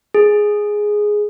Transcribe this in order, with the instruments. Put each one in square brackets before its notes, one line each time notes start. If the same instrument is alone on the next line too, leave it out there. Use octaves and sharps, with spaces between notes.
[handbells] G#4